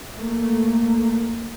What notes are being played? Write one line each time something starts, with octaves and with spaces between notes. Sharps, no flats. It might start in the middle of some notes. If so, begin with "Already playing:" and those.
A3 A#3